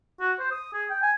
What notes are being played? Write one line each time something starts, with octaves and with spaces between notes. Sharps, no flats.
F#4
C5
D#6
G#4
G5
G#5